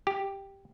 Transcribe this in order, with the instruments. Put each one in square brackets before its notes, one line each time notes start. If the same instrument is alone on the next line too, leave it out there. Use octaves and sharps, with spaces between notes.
[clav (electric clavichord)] G4